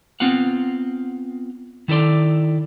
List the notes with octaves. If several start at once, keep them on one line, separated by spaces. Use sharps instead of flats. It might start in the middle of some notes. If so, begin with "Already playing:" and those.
B3 C4 F4 F5 F#5
D#3 E4 A4 D5 C6